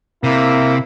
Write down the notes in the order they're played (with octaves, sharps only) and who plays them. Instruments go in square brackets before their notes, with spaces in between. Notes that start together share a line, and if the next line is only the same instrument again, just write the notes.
[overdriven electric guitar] C3 [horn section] A#3 E4